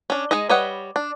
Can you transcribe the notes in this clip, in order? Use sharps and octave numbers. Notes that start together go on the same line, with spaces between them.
C#4 D4
G#3 D#4 G#4 D#5
G3 B4 C#5 D#5 F#5
D4